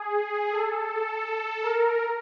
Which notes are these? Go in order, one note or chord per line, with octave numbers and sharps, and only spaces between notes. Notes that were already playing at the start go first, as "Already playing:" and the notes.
Already playing: G#4
A4
A#4